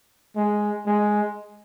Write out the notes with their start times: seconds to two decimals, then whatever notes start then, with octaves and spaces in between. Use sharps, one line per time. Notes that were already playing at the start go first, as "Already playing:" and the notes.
0.36 G#3
0.86 G#3